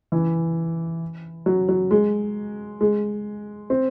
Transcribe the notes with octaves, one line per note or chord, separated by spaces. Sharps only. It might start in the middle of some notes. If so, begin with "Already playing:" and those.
E3
F#3
F#3
G#3
G#3
C4